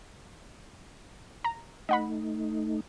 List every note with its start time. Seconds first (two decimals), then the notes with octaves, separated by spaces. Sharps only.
1.44 A#5
1.89 A3 D#4 D#5 F#5 B5